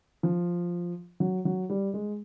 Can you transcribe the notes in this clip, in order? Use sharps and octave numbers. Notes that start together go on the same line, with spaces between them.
F3
F#3
F#3
G3
G#3